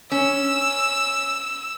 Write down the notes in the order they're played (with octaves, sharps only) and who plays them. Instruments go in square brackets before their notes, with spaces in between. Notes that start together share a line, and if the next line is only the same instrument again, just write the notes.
[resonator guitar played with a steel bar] C#4 [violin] E6